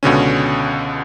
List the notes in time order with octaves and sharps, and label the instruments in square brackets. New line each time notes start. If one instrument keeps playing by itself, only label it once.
[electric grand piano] C#2 B2 D3 C#4